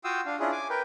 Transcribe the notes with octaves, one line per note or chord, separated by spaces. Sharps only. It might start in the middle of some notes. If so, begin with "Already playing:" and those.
F4 F#4 F5 G5 D#6 E6
D4 F5
C#4 D4 E4 F4 G#4
G#5 D6
A#4 B4 G5